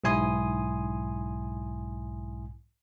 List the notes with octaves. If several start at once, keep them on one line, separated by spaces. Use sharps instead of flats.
B1 G#2 E4 G#5 C6 D#6